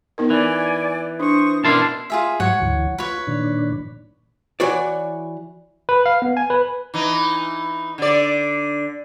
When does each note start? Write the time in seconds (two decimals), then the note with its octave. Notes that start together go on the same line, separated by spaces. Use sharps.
0.18 B3 D#4 A#4
0.30 E3 D5 G#5
1.20 D4 C5 C#6 D#6
1.64 B2 C#4 D4 E4 A#4 A5 C6 F6
2.10 F4 G#4 E5
2.40 G#2 F#3 C#5 F#5
2.62 D2 E3
2.98 F4 B4 C#5
3.27 A#2 D#3 D4
4.60 E3 F#4 C#5 D5
5.89 B4
6.06 F5
6.22 B3
6.37 G#5
6.50 B4
6.94 E3 D#4
7.98 D3 D5